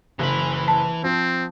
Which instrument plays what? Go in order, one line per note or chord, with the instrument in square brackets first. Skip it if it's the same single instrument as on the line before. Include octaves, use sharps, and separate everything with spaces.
[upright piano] F#1 [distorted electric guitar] E3 B5
[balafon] A5
[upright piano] F3 [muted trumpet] C4